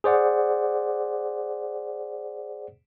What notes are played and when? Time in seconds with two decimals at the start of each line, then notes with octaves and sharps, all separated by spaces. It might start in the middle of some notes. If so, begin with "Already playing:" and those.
0.04 G#4 C5 D5 F#5